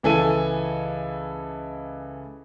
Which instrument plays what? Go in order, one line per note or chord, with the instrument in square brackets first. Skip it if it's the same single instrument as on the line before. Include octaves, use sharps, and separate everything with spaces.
[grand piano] C#2 E3 A4 G#5 D#7